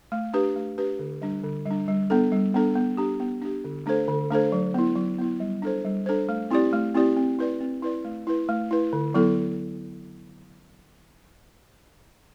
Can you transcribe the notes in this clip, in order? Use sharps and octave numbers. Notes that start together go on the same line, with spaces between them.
A3
D4 G4 B4
A3
D4 G4 B4
D3
G3 D4
D3
G3
D4
G3
B3 D4 A4
G3
B3 D4 A4
B3
D4 G4
B3
D4 G4
D3
A3 D4 A4 C5
D3
A3 D4 A4 C5
F#3
B3 E4
F#3
B3 E4
G3
D4 A4 C5
G3
D4 A4 C5
A3
C4 E4 G4 D5
A3
C4 E4 G4 D5
C4
E4 B4 D5
C4
E4 B4 D5
A3
E4 B4
A3
E4 B4
D3
F#3 B3 E4 A4